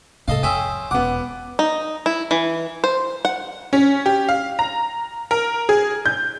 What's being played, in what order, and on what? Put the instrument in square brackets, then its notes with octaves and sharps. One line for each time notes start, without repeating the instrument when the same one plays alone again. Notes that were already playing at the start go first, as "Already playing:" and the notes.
[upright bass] G#2 C3 [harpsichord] A4 D#5 F5
[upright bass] F2 [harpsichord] C4 C#4 E5 [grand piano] D#6
[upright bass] E1 [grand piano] B3 D6 [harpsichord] F#5
[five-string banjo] D#4
E4
E3
C5
F#5
[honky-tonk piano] C#4
G4
F5
A#5
A#4
G#4
G6